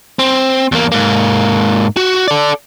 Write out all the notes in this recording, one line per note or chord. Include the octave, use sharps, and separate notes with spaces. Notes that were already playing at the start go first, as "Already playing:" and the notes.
C4
E2 A#3
G#2 A#3
F#4
A4 D5